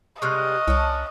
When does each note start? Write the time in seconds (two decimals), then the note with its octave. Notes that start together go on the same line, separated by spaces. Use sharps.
0.22 C3 G3 G#3 D#5 C#6 F6 F#6
0.68 C2 C#4 D4